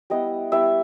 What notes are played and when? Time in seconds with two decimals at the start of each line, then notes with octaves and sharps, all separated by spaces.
0.10 G3 B3 E4 D#5
0.52 G3 B3 E4 E5